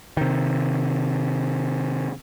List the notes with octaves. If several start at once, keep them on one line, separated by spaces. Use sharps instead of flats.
C3 D#3